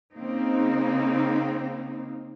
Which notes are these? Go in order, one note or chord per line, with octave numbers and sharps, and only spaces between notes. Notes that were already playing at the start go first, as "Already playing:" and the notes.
C#3 A#3 C4 D#4